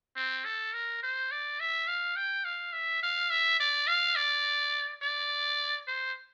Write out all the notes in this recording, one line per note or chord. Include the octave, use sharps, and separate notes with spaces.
C4
A4
A#4
C5
D5
E5
F5
G5
F5
E5
F5
E5
D5
F5
D5
D5
C5